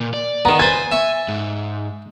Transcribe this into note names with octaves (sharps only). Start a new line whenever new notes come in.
A#2
D5
D#3 B3 A#5
B4 C5 G#5 A6
E5 C#6
G#2